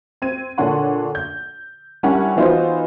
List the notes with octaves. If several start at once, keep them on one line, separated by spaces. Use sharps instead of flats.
C4 G#6 D#7
A#2 D3 D4 C#5 F#5 C6
G6
G3 C#4 D4 E4 A#4 F#5
E3 B3 D#4 F4 F#4 C5